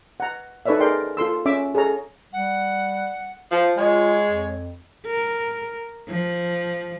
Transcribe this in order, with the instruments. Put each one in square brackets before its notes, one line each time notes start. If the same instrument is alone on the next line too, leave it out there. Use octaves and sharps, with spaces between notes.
[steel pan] F#5 A#5
D#4 A4 B4 C#5 D5 E5
G#4 A#4 D5 G5 C6
F4 A4 C6 E6
C#4 E5 D6
G#4 A4 C#5 A#5
[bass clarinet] G3 [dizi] F#5
[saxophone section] F3
[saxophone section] G#3 [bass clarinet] F4 [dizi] C#5
[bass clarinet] F2
[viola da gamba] A#4
F3